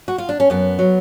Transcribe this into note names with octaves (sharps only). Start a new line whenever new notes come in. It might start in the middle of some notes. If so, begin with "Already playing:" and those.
F#4
F4
D4
C#4
F#2 B3
F#3